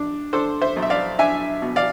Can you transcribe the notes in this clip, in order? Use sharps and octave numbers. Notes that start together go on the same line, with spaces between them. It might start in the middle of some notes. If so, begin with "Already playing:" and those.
Already playing: D4
D4 A4 C5
C5 E5
B1
E5
D5 F5
D4 E5 G#5
B2
D5 F5